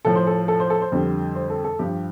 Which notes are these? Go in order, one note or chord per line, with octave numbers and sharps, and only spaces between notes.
A2 F3 A4
C5
A4
A4
C5
A4
C5
F2 D3 G3
C5
A4
A4
G2 F3 G4